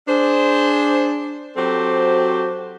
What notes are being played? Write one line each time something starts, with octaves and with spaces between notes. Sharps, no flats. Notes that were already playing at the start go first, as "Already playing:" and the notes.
D4 G#4 C5
F#3 C4 F#4 G4 A4 C5